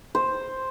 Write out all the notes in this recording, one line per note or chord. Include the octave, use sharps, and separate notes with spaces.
C5